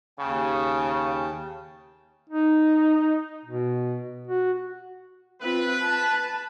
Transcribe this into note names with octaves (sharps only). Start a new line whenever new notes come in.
D#2 C#3 G5 A5
D#4
B2
F#4
C4 F4 B4
A5